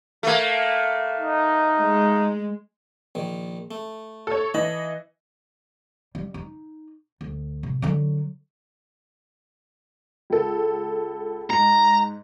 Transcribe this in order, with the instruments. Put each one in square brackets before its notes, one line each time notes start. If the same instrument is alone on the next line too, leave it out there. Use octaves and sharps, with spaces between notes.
[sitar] A3 A#3
[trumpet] D#4
[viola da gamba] G#3
[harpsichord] A#1 D#3
A3
[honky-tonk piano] A4 C#5
[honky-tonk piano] E3 D#5 [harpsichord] A5 B5
[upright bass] G3
D#4
D2
A2 C3
D3 F#3
[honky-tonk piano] C#2 A4
[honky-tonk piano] G#2 [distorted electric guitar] A#5